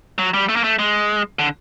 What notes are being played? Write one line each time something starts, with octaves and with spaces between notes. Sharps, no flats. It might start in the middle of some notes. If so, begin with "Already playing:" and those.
F#3
G3
A3
A#3
A3
G#3
D3